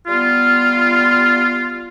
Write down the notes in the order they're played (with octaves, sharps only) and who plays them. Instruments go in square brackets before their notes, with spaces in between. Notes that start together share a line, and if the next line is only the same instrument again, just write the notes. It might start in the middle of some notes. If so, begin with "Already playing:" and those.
[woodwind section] G3 B3 F4